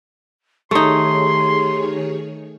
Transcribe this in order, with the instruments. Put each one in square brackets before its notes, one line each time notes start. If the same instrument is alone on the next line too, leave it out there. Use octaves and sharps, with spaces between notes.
[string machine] D#3 G#4 C#5 [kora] A3 D#4 [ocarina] G4 [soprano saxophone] C6